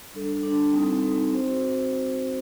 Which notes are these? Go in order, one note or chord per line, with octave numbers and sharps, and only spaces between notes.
G3 D4 A4
G3 D4 A4
G3 C4 D#4 A4
G3 C4 D#4 A4
C4 F#4 C5